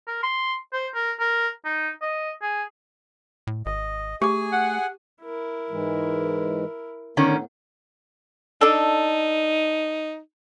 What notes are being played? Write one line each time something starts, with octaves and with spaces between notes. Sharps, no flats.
A#4
C6
C5
A#4
A#4
D#4
D#5
G#4
A2
G#1 D#5
A3 G4 G#4 G#5 D6
F#5
E4 A#4
G#2 E3 G#3
A2 D3 D#3 B3 C#4
D4 D#4 A4